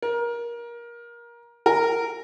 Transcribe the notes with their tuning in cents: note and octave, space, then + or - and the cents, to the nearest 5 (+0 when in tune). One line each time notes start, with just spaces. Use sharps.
A#4 +20
A#4 -10